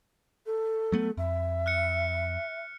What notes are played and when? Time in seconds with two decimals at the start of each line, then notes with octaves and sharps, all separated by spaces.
0.46 A4
0.92 F#3 A3 B3
1.17 F2 E5
1.66 F6 F#6 C#7